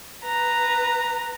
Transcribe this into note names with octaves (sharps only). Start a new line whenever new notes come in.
B4 A#5